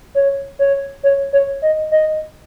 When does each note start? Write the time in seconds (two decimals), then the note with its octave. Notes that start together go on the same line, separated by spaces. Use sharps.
0.15 C#5
0.59 C#5
1.03 C#5
1.33 C#5
1.62 D#5
1.91 D#5